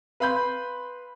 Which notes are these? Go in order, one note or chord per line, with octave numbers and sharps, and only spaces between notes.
B4 F5 B5 C6 G6